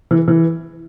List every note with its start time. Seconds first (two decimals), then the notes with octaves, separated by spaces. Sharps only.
0.11 E3
0.28 E3